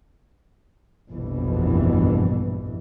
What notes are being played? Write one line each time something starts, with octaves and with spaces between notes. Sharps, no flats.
F1 A#1 G2 B2 E3